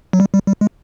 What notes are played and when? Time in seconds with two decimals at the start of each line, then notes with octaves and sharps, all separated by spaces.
0.13 F#3
0.20 G3
0.34 G3
0.47 G3
0.61 G#3